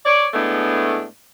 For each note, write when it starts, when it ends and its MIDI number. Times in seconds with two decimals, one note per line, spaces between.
0.06 0.27 73
0.06 0.27 74
0.34 1.05 45
0.34 1.05 56
0.34 1.05 57
0.34 1.05 59
0.34 1.05 62